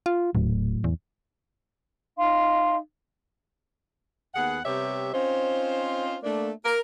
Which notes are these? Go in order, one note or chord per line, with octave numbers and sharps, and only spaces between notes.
F4
D#1 A2 F#3 A3
E2
D#4 F5 C6
D#2 B3 G#4 F#5
C3 G3 B3 G4 C#5 E5
C4 C#4 D#4 F4 C5
A3 A#3 D4
A#4